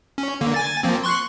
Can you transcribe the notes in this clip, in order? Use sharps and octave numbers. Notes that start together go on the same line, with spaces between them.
C#4
D3 A#3
G#5 A6
F3 A#3 C4
C6 C#6 F#6